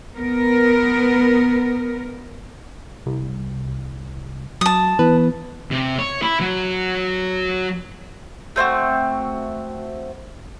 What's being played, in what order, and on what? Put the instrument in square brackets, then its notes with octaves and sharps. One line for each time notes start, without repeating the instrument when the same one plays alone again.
[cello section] B3 A#4
[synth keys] C2
[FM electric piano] F#3 [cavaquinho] A5 D#6
[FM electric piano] E3 B3 [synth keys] B4
[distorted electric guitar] C3
C#5
E4
F#3
[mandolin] A3 C4 E4 F#4